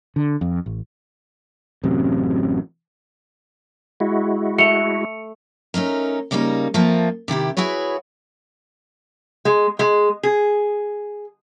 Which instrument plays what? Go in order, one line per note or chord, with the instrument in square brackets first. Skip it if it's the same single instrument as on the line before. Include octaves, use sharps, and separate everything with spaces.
[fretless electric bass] D3
F2
A1
[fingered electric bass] A1 F#2 C3
[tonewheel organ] G#3 E4 F#4
[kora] A3 [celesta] C#7 F7
[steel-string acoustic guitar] A3 C#4 D#4 A#4
C#3 G3 A#3 C4 D#4
F3 A3 A#3 C4
C3 D#3 E4 G4
E4 F#4 G#4 B4 C#5
[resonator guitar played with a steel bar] G#3
G#3
G#4